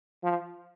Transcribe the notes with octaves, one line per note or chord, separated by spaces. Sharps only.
F3